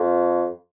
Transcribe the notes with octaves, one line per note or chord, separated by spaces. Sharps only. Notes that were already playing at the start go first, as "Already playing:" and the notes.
Already playing: F2